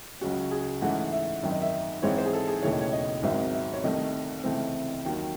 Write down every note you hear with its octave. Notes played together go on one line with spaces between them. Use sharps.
C#2 C#3 F#3 C#4 F#4
G#4
G#2 E3 A3 C#4 F#5
E5
G#1 F#2 D#3 E5
D#5
E5
G#2 E3 G#3 C4 C#5
C5
G#4
A4
G#4
E1 D#2 C#3 E3 A3 C#5
D#5
C#5
D#5
G#1 G#2 F#3 C4 E5
E5
C#5
C2 C3 D#3 A3 D#5
C#2 C3 E3 A3 C4
D#2 D#3 F#3